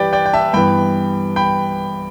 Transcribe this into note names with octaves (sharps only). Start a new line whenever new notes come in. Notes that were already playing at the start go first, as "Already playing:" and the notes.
Already playing: G2 E3 G4 B4 D5 G5
D5 G5
G5
E5 A5
G2 E3 B3 G5 B5
G5 B5